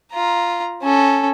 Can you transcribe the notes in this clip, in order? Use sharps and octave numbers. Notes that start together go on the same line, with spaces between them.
F4 A#5
C#4 A4